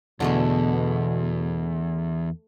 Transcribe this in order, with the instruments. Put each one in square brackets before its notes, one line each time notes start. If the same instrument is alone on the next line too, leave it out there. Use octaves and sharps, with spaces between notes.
[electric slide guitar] E2 [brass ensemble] B2 [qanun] D3 G#3 A3